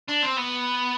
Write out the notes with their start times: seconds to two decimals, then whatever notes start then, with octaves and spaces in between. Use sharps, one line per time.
0.09 D4
0.23 C4
0.38 B3